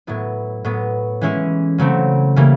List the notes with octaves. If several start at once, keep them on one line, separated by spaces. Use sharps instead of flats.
A2 F#3 B3 E4
A2 F#3 B3
E3 G#3 C#4 E4
C#3 F#3 A3 C4
C#3 E3 G3 A#3